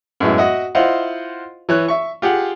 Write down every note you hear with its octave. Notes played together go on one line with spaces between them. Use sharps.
F#2 A2 G#3 B3 E4
F#4 D#5 E5 F#5 D#6
E4 F4 C5 D#5 F5 F#5
E3 C#5 F#6
E5 C#6
F4 G4 G#4 F#5